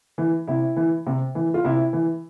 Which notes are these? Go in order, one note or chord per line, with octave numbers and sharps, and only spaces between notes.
E3
C3 E4
E3
C3
E3
F4
C3 E4
E3